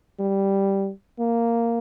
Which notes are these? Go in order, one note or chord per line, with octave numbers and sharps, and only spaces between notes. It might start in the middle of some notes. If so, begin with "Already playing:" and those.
G3
A#3